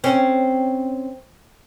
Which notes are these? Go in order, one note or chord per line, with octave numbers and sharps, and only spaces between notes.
C4 C#4